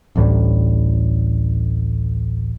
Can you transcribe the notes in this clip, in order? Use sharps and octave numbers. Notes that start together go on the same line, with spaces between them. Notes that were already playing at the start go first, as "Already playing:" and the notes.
A1 D2 A2 G3